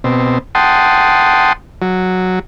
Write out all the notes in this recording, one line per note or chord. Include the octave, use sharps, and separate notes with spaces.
B2 C4
F#5 G5 A5 C6 D#6
F#3